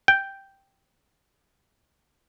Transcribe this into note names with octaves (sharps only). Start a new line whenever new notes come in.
G5